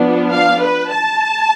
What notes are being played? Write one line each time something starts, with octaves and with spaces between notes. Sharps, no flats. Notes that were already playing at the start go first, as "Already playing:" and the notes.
Already playing: F3 B3 D4
F5
B4
A5